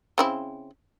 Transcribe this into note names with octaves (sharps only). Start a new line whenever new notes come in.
C#3 C4 E4